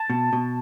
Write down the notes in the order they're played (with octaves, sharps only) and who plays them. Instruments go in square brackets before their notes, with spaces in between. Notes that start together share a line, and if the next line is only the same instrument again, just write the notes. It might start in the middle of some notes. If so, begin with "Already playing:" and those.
Already playing: [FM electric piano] A5
[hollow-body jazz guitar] B2
B2